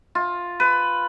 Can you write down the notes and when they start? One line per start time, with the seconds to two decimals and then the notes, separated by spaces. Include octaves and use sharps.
0.15 F4
0.60 B4